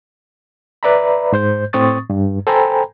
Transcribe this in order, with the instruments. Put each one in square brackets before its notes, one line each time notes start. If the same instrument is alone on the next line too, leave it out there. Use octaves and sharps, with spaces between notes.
[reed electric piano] B4 D5 E5 A#5 B5
G#2 C5 G6
A2 C4 C#6 D#6 A6
G2
A4 C5 G5 G#5 A#5 B5